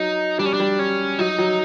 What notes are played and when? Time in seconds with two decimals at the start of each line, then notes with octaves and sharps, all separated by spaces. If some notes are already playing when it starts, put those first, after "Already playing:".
Already playing: F#3 D#4
0.39 G3 D4
0.45 C#4
0.53 D4
0.60 G3
0.79 C#4
1.19 F#3 D#4
1.39 F#3